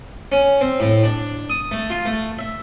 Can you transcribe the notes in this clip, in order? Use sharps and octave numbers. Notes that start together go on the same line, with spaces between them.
C#4
C4
A2
D4
D#6
A3
F4
A3
E5